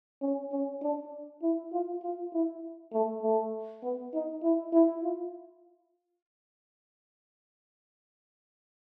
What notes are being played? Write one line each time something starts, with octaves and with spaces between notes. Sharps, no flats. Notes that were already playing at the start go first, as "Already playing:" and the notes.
C#4
C#4
D4
E4
F4
F4
E4
A3
A3
B3
D#4
E4
E4
F4